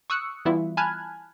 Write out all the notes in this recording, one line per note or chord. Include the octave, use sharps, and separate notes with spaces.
C#6 D#6 E6 F#6 C#7
E3 G3 B3 E4 F4 E5
G#5 A5 B5 F6 F#6 G#6